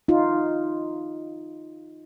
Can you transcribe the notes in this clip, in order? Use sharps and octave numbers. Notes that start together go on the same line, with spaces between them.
D#4 F4